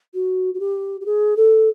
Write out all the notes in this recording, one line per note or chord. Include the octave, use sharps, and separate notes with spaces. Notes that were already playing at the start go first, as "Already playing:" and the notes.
F#4
F#4
G4
G4
G#4
A4